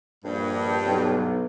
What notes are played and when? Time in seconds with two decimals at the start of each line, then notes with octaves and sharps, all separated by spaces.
0.24 A#1 G2
0.85 B1